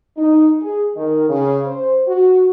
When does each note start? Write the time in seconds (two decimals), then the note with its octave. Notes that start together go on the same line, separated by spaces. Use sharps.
0.17 D#4
0.62 G#4
0.96 D#3
1.29 C#3
1.66 C5
2.07 F#4